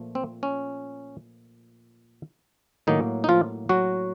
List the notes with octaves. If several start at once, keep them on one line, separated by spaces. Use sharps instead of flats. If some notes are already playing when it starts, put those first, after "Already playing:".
Already playing: A#2 F3 A3
C4
C#4
A2 D#3 F#3 A#3 D#4
D#4
F3 F4
F#3 F#4